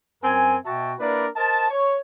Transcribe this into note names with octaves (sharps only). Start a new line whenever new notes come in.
F#2 C4 A#4 G#5
B2 F#4 E5 G5 A5
A#3 D4 E4 A#4 B4 D5
A#4 C5 D#5 A5
C#5